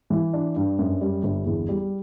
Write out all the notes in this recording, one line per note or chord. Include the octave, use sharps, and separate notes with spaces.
E3
D4
G2
F#2
G3
G1
E2
G3